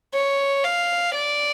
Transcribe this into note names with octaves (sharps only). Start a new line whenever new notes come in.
C#5
F5
D5